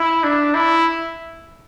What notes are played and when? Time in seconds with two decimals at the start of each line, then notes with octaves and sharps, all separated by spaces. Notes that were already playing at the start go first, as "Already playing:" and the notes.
Already playing: E4
0.24 D4
0.55 E4